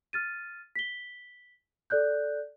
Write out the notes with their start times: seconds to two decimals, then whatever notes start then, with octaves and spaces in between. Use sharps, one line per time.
0.13 F6 A6 D#7
0.76 B6 G7
1.90 A4 D5 F#6 G6